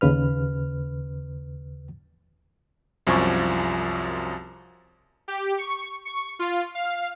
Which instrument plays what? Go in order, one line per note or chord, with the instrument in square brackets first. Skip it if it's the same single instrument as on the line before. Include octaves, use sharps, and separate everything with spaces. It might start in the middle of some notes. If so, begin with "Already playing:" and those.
[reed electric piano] D#2 C#3 B4 F6
[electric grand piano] C2 F#2 F3 G#5 C#6
[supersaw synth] G4
C#6
C#6
F4
F5